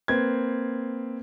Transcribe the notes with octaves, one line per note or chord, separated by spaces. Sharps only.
A#3 C4 B4 G#6